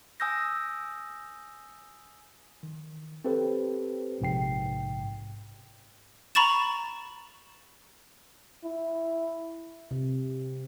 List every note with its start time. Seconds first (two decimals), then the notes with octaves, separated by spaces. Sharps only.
0.20 G#5 D#6 E6 G6 A#6
2.63 D#3
3.25 C4 G4 A4 B4 C5
4.21 A#1 G#2 C3 G5 C7
6.35 A#5 B5 C#6 A6 E7
8.64 E4
9.91 C3